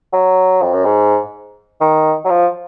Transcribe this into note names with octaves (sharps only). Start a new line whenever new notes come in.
F#3
F2
F#2
G#2
D#3
F#3
F3